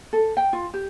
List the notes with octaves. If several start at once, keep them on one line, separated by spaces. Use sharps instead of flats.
A4
G5
F4
G4